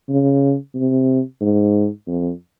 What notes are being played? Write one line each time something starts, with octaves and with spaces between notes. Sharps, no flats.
C#3
C3
G#2
F2